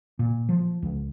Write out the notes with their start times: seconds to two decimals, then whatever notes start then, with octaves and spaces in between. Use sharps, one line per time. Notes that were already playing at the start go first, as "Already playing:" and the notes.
0.19 A#2
0.49 F3
0.82 C#2